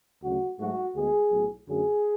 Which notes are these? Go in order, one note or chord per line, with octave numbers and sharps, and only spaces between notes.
D2 C#3 F#3 A3 F#4
G#2 F#3 A3 F#4
D2 D3 G#3 B3 G#4
B1 A2 F#3
F#2 D3 F#3 A3 G#4